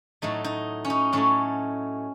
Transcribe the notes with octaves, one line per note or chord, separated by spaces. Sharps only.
A2 F#3 A3 D#4
D#4
C#4
D#4
A2 F#3 A3 C#4